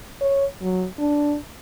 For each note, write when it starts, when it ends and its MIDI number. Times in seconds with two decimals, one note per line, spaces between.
0.21 0.46 73
0.62 0.86 54
0.99 1.36 62